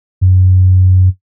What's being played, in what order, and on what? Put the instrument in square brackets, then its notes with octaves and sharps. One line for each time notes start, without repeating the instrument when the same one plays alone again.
[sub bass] F#2